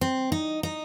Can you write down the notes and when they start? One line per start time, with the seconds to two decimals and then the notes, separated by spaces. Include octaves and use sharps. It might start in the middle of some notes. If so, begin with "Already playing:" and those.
0.01 C4
0.32 D#4
0.63 D#4